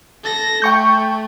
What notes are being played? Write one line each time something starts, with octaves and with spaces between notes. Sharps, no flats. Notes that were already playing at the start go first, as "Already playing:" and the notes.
A4 A#6
A3 G5 C#6 G6